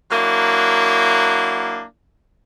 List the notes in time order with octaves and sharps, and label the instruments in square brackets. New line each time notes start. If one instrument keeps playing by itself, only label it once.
[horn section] F#3 A#3 D4 E4